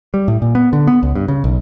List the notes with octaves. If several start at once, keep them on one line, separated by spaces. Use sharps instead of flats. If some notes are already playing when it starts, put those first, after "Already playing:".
G3
A2
A#2
B3
D3
B3
C#2
G2
C#3
B1